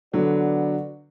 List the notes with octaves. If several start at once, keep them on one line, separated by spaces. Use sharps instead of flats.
D3 F#3 B3 F#4 B4 D5